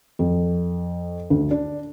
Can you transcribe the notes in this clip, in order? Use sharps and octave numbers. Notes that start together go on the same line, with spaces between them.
F2
D2
D4